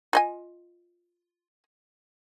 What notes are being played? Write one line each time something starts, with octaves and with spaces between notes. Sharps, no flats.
F4 D#5 G#5